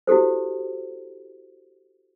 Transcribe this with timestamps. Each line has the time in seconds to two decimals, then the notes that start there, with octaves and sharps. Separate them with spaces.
0.07 E4 F#4 G4 A4 C5